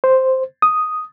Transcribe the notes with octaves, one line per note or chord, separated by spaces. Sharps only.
C5
D#6